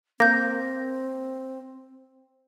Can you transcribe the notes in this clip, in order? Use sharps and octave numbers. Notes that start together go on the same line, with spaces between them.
A#3 C4 G6 A#6